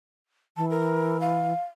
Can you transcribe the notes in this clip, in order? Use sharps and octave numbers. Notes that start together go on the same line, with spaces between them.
E3 A5
A#4
F5